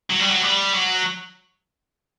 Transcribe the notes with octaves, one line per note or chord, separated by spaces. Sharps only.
F#3
G3
F#3
G3
F#3